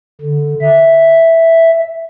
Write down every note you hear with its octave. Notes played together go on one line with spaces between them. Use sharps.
D3
E5